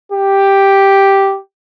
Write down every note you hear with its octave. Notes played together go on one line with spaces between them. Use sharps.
G4